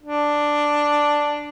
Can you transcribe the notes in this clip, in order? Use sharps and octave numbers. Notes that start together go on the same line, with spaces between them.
D4